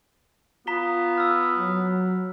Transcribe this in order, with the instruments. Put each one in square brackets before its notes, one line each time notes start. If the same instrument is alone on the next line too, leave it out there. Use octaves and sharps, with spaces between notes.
[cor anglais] B3 [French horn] F4 [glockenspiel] A#5 B6 G7
[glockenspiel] E6 F6
[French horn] F#3